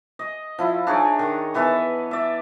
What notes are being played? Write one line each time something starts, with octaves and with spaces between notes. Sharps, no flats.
D#5
F3 E4
D4 D#4 G#4 C#5
D#3
E3 B3 E5 A5
D5 E5